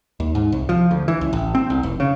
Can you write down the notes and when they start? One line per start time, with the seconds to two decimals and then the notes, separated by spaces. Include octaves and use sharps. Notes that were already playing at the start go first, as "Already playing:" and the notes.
0.20 D#2
0.35 G#2
0.52 C2
0.69 F3
0.91 D2
1.08 E3
1.21 C#2
1.33 A1
1.55 C4
1.70 C2
1.83 F1
2.00 C#3